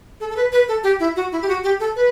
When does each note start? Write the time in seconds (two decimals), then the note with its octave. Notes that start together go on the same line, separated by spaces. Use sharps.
0.20 A4
0.30 A4
0.37 B4
0.52 B4
0.68 A4
0.84 G4
1.00 E4
1.16 F#4
1.32 E4
1.42 G4
1.48 F#4
1.64 G4
1.80 A4
1.96 B4